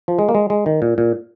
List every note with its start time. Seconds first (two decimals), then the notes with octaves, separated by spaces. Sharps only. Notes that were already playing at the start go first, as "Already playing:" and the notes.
0.08 F3
0.19 G#3
0.29 A#3
0.35 G#3
0.50 G#3
0.66 D#3
0.82 A#2
0.98 A#2